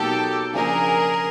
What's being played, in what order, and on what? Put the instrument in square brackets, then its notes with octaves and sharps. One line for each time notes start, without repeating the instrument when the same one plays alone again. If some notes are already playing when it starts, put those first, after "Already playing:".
Already playing: [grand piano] B2 F#3 A#3 D#4 [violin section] G4 A4
[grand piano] C#3 F3 A#3 D4 F4 [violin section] G#4 A#4